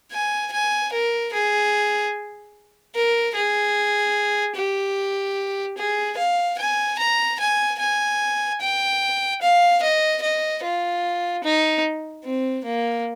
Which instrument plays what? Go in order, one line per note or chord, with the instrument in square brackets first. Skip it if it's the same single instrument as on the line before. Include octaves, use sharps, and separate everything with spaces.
[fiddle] G#5
G#5
A#4
G#4
A#4
G#4
G4
G#4
F5
G#5
A#5
G#5
G#5
G5
F5
D#5
D#5
F4
D#4
C4
A#3